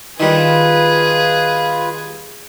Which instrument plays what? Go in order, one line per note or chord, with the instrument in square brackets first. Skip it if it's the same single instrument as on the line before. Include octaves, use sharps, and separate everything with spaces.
[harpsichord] D#3 G3 [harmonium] F4 B4 [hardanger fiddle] G#4